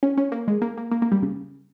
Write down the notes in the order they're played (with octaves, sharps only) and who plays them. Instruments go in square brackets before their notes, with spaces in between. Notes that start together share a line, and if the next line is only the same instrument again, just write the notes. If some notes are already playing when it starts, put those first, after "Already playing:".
[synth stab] C#4
C#4
A#3
G#3
A#3
A#3
A#3
A#3
G3
C#3